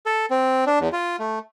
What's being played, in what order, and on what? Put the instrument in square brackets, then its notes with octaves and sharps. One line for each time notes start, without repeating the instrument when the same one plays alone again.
[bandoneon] A4
C4
D4
E2
F4
A3